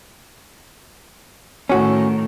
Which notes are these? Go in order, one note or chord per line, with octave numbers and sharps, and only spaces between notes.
A2 D#3 C#4 F#4